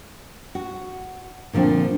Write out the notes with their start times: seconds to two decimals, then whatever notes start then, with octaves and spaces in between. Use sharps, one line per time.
0.55 F#4
1.53 A#2 D3 F3 A3 C4